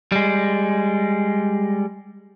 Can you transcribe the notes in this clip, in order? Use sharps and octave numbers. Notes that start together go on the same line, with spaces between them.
G3 G#3